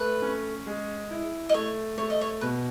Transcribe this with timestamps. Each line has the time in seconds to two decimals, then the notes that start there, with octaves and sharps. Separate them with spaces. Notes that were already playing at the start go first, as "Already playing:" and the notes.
Already playing: A3 B4
0.22 C#4
0.66 G#3
1.11 E4
1.49 D#5
1.54 A3 C#5
1.98 A3 C#5
2.10 D#5
2.21 C#5
2.41 B2 B4